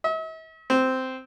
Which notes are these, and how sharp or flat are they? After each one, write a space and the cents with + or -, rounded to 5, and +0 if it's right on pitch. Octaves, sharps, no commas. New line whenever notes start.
E5 -45
C4 -10